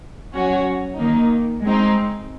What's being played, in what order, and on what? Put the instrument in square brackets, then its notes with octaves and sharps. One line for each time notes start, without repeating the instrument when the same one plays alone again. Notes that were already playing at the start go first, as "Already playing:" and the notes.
[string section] F#3 C#4 F#4 C#5
D#3 A#3 D#4
G#3 C4 D#4